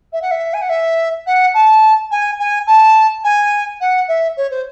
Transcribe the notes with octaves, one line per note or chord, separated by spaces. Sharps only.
E5
F#5
E5
G#5
F#5
E5
F#5
A5
G#5
G#5
A5
G#5
F#5
E5
C#5
C5